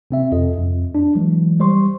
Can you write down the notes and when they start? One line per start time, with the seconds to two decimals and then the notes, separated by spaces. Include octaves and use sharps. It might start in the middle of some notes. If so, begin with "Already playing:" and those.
0.11 C3 C4 E5
0.32 F2 F4 A4 D#5
0.58 F2
0.95 D4
1.15 E3 F#3 G#3
1.60 G3 C5 C6 C#6